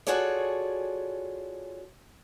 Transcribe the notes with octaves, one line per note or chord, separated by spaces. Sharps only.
F4 F#4 G#4 A4 C#5 D5